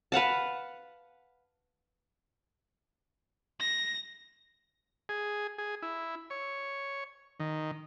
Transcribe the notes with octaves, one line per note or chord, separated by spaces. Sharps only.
B4 F5 F#5 A5
A#6
G#4
G#4
E4
C#5
D#3